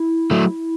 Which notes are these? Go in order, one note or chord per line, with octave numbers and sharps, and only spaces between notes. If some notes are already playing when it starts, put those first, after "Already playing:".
Already playing: E4
F#3 A3